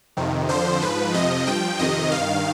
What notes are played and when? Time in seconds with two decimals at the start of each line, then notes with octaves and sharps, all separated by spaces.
0.17 F2 C3 D#3
0.49 F2 D3 F3 C5
0.81 G#2 F3 B4
1.14 F2 C3 F3 D#5
1.47 G2 F3 G5
1.79 F2 C3 D#3 D#5
2.11 G2 D#3 F5